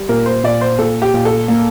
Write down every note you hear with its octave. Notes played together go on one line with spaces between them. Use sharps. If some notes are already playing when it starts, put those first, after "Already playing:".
Already playing: G3
A#2 A#4
C5
A#2 D5
C5
A#2 A4
G4
A#2
A4
A#3